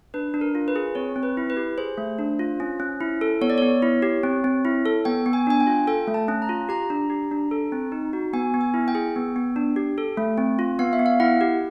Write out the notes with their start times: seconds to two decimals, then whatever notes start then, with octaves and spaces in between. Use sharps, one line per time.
0.14 D4 B4
0.34 D4
0.41 A#4
0.55 F4
0.68 B4
0.76 G#4
0.95 C4 C#5
1.16 C4
1.23 B4
1.37 E4
1.50 B4
1.57 G4
1.78 G#4 C5
1.98 A3
2.19 D4
2.39 F4
2.60 C#4
2.80 C#4
3.01 E4
3.21 A4
3.41 B3 C#5
3.50 D5
3.58 B3 C#5
3.82 E4
4.02 G4
4.23 C4
4.44 C4
4.65 E4
4.86 A4
5.05 B3 G5
5.26 B3
5.33 G#5
5.47 D4 G#5
5.60 G5
5.67 F4
5.87 A4 G5
6.08 A3
6.14 A5
6.28 C#4
6.42 A#5
6.49 F4
6.69 G4 A#5
6.90 D4
7.10 G4
7.31 D4
7.51 A4
7.72 C4
7.92 D#4
8.13 F#4
8.33 B3 G#5
8.54 B3
8.61 G#5
8.74 E4
8.88 G5
8.95 G#4
9.16 B3
9.36 B3
9.56 D4
9.76 G4
9.98 A4
10.17 A3
10.38 C4
10.59 F4
10.79 B3 F5
10.93 E5
10.99 B3
11.06 F5
11.20 E4 F#5
11.41 G4